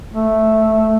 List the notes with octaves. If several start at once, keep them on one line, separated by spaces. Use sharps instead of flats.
A3